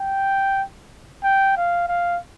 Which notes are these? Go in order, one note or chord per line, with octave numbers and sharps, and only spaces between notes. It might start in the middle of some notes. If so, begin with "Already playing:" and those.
Already playing: G5
G5
F5
F5